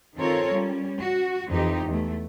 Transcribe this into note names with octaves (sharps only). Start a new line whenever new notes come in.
D#3 C4 F4 A4 A#4 C#5
G3 C#4
F#4
F2 E3 D#4 G4
E2 A3